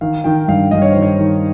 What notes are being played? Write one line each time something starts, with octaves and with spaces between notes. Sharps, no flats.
D#3 F5
D#3 G5
G2 F5
G2 D#5
C#5
D#3 C5
C#5
D#3